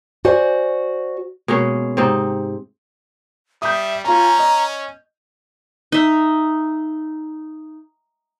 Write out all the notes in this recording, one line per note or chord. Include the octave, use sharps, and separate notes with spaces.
F#4 C5 D5 G#5
B2 G#3 A#3 C#4
G#2 C3 C4 D#4
G3 E5 D#6 G6
C#4 F4 G#5 A#5
D#5
D#4 E5